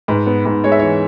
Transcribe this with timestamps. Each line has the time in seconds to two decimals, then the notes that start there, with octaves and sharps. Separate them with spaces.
0.08 G#2 B4
0.27 B3
0.46 G#2
0.64 G#3 C#5
0.72 E5
0.79 E3 C#5